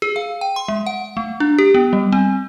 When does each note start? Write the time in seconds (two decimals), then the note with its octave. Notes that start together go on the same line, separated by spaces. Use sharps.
0.02 G#4
0.16 F5
0.41 G5
0.56 C6
0.68 G#3
0.86 F#5
1.17 A3
1.40 D4
1.58 G4
1.75 B3
1.93 G3
2.12 C4